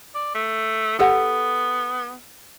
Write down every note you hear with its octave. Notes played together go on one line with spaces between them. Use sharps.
D5
A3
B3 G4 A4 F#5